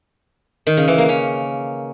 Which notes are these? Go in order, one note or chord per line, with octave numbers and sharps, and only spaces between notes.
D#3
C#3
E3
A#3
C#4